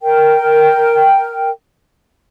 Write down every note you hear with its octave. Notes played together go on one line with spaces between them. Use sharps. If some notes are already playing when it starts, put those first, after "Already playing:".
A#4 G5